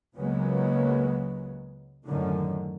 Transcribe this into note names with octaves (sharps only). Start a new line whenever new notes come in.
C#2 C#3 F#3 G#3 A#3 B3
A1 F#2 D3 D#3